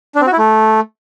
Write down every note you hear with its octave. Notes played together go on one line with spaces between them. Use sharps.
D4
C4
F#4
E4
A3